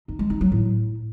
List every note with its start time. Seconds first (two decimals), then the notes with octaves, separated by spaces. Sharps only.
0.08 D#4
0.19 G#3
0.30 D#4
0.41 F#3
0.52 A2